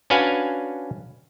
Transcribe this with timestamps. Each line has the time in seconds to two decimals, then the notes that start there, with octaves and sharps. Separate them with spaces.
0.10 C#4 D4 F#4 B4 F5 G#5